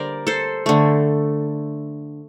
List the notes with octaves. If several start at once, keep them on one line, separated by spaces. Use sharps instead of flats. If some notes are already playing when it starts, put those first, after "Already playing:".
Already playing: D3 G3 A#3 G4 A#4 C5 D5
A4 C5
D3 A3